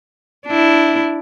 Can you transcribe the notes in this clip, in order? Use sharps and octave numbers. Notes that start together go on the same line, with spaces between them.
D4 E4